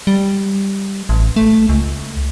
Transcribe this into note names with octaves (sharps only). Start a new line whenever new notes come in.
G3
A1
A3
C#2